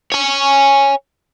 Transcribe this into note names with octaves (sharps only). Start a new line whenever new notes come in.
C#5 G#5